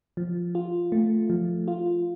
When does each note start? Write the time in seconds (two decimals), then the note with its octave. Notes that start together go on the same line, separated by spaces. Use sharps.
0.17 F3
0.55 F4
0.92 A3
1.30 F3
1.68 F4